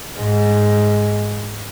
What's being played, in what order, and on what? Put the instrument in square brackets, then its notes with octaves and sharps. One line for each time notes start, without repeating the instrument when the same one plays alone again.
[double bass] G#2 G#3